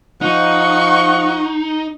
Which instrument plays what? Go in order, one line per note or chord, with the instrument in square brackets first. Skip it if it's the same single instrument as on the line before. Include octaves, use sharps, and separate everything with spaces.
[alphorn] F3 [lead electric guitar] D#4 [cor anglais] F#5 [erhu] C#6